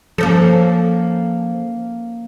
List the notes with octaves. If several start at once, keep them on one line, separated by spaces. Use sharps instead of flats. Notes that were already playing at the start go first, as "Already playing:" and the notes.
F3 A#3 C#4 A4